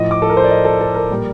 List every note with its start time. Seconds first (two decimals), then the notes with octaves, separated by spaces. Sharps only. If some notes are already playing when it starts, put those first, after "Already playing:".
Already playing: A2 F3 D#5
0.11 D6
0.22 A4
0.30 A#4
0.37 C5
0.44 D5
0.51 D#5
0.65 A4
0.81 A4
0.94 A#4
1.10 A#2 G3